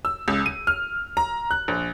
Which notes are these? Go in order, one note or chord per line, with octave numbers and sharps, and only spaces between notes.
E6
C#2
D#7
F6
A#5
F#6
A#1